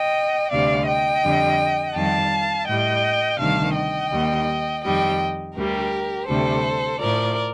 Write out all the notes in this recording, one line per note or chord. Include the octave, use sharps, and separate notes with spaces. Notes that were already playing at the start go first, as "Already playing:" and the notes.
Already playing: D#5 G5
D2 C3 G3 D5 F5
D#5 G5
F2 D3 G3
F2 D#3 G3 F5 A5
A2 G3 D#5 G5
D2 C3 D#3 G3 F5 A5
D#5 G5
D#2 D#3 G3
F2 D#3 G3 D#5 G5
D2 D3 G3 G4 A#4
D2 C3 G3 A4 C5
A2 F3 A#4 D5